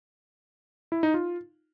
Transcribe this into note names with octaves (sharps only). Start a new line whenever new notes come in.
E4
D#4
F4